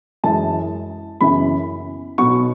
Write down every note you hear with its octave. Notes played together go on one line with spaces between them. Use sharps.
F#2 E3 G#3 A5
F#1 F#2 C#3 E3 B3 B5
B1 B2 F#3 B3 C#6